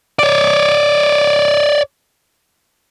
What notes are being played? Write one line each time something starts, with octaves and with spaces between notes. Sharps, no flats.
C#5 D5